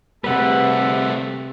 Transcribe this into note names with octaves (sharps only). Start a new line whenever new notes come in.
C3 G3 A3 A4 B4 F#5